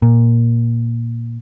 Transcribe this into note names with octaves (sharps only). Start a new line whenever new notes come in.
A#2